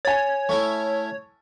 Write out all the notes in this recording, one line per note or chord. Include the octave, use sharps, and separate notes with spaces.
C#5 G#5 A6
A3 C#4 E4 C#6